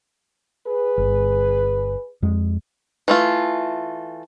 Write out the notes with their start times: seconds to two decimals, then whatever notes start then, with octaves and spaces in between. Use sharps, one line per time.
0.67 G#4 B4
0.98 G1
2.22 F2 G#3
3.08 E3 A3 F4